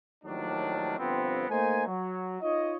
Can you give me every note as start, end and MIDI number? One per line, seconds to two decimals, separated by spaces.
0.24 0.94 39
0.24 0.94 45
0.24 0.94 51
0.24 0.94 53
0.24 0.94 54
0.24 0.94 62
0.97 1.43 31
0.97 1.43 53
0.97 1.43 59
0.97 1.43 60
1.49 1.85 57
1.49 1.85 58
1.49 1.85 63
1.49 1.85 72
1.49 1.85 80
1.86 2.37 54
2.41 2.75 63
2.41 2.75 65
2.41 2.75 73
2.41 2.75 75